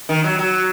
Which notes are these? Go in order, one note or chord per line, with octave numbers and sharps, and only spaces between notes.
D#3
F#3
F#3